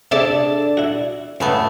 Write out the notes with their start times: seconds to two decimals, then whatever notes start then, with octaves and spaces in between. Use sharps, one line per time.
0.11 C3 D4 G#4 A4 D5 E5
0.77 E4 F#4
1.40 C#2 G2 C#3 A3 B3